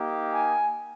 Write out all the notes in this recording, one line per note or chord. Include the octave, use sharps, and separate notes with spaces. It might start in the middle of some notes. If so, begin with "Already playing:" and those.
Already playing: A#3 D#4 G4
G#5